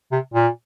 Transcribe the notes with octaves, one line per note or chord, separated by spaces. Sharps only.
C3
A#2